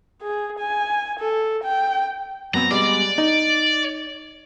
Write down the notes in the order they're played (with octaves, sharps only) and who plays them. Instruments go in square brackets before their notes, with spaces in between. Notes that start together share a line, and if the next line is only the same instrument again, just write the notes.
[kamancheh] G#4
G#5
A4
G5
[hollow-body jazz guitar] F#2 B3 C4 [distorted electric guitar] A#5
[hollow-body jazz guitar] G3 G#3 B3 [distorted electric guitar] D5
[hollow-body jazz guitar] D#4